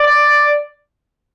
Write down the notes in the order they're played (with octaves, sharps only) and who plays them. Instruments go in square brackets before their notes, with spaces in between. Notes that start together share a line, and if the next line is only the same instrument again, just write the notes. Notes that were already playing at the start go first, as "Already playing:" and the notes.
Already playing: [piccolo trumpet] D5